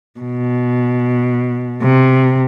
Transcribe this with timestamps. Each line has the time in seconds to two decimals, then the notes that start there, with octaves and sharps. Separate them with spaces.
0.21 B2
1.82 C3